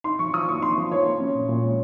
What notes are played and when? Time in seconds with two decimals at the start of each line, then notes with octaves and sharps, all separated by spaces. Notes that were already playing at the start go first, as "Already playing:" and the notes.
0.04 D#4 C6
0.19 F3 C#6
0.34 F3 D#6
0.48 A#3 C#6
0.62 D#4 C6
0.78 F3
0.91 F3 C#5
1.06 A#3
1.20 C#4
1.35 A#2
1.48 A#2
1.63 G#3